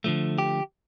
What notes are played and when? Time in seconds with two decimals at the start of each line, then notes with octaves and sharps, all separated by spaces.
0.04 D3 F3 A3
0.38 G4